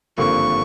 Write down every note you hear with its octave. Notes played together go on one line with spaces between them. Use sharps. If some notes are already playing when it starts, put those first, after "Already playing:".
G#1 G2 D3 F3 A#3 C#6